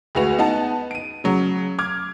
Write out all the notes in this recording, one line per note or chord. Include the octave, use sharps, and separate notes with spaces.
D2 G#3 F#4 B4 F7
B3 D#4 F#5 A5
D7 D#7
C#3 F#3
D6 F6 G#6